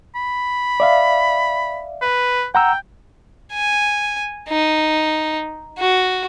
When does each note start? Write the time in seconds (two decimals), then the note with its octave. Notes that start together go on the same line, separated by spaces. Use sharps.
0.15 B5
0.80 D5 E5 F5
2.02 B4
2.55 F#5 G5 A#5 E6
3.53 G#5
4.48 D#4
5.79 F#4